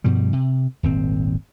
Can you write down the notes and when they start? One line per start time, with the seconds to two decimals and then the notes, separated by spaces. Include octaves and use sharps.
0.04 G2 B2 F3 G3
0.33 C3
0.83 D#1 G#1 C4